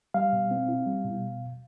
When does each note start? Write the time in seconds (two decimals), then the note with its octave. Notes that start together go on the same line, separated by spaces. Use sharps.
0.14 G3 F5
0.33 B2
0.51 C4
0.68 E4
0.87 G3
1.05 B2